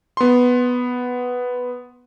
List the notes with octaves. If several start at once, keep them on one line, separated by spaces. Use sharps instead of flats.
B3 C6